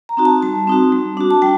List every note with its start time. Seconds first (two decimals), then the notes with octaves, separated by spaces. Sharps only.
0.09 A#5
0.17 C4 D#4 F#4
0.25 A5
0.42 G3 A5
0.67 C4 D#4 F#4
0.92 G3
1.17 D4 F#4
1.30 A5
1.42 G3 G5